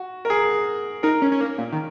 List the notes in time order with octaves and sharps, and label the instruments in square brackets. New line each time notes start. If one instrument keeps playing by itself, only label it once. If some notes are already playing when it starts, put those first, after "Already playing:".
Already playing: [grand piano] F#4
A#4
G#4
[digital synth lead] D#4 [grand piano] A#4
[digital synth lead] C#4
C#4
A#3
A#2
D#3